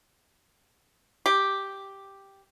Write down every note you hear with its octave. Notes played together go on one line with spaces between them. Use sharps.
G4